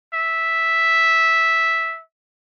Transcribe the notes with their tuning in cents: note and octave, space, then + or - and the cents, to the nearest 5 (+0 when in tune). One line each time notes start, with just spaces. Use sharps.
E5 -5